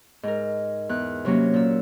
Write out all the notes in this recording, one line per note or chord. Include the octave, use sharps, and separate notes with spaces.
G#2 A#4
E2 F#6
C3 F#3 A#3 C#4
A#2 E6